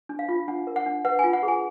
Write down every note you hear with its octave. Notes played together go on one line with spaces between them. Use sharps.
D4
F5
F4
D4 F#5
A#4
F#5
D4
B4 F#5
F4 G#5
F#5
G#4
G#5